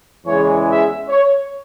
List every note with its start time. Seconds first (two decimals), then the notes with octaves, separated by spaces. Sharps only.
0.25 E2 C#3 E3 G#3 C#5
0.68 E5
1.09 C#5